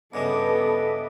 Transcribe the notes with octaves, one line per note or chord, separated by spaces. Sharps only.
G2 C#3 G3 B3 A4 D#5 E5 D6